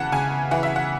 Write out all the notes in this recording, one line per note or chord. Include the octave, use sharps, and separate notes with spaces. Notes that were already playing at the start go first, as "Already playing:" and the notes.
Already playing: C#3 E3 F#5 A5
C#3 G#5
E3 F#5
E5
F#5